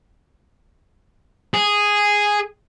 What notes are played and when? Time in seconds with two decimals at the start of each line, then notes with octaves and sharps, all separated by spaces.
1.54 G#4